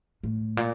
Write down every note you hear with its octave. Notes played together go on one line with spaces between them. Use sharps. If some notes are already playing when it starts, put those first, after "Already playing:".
A2
A#2